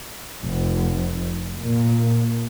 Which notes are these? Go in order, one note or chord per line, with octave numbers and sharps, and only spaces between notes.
F1
A#2